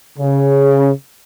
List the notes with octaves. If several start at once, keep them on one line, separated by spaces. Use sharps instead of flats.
C#3